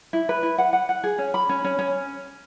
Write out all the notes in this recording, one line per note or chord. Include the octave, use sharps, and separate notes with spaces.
E4
B4
E4
F#5
F#5
F#5
G#4
C#4
B5
C#4
C#4
C#4